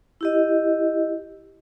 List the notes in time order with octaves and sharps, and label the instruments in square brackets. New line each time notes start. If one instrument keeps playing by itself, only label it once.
[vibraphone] E4 G4 D#5